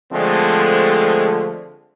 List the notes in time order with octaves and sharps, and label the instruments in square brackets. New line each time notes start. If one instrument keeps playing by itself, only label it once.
[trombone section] D3 F3 G#3 A3 C4